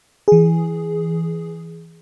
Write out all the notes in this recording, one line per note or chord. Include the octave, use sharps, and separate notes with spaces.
E3 G#4